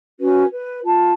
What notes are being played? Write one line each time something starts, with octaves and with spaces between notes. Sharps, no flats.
C#4 F#4 B4
B4
F4 A5